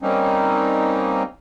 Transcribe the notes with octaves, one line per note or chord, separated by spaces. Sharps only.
G3 A#3 C4 C#4 D#4